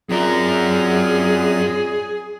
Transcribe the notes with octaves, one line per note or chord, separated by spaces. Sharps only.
F#2 C4 F4 G#4 A#4 D5